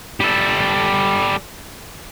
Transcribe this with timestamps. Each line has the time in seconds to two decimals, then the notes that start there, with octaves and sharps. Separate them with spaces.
0.20 G3 A4